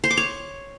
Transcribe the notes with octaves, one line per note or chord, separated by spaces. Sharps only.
C5
D6
C#5